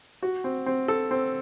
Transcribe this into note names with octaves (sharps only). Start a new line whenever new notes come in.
F#4
C4
C4
A4
C4